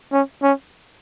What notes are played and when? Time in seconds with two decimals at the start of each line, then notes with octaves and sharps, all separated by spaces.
0.12 C#4
0.43 C#4